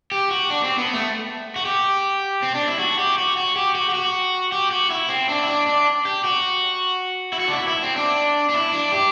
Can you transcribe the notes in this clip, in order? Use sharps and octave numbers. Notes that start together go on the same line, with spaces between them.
G4
F#4
D4
C4
B3
A3
F#4
G4
C4
D4
E4
F#4
G4
F#4
F#4
G4
F#4
G4
F#4
G4
F#4
E4
C4
D4
E4
D4
D4
G4
F#4
E4
F#4
D4
E4
E4
C4
D4
D4
E4
D4
G4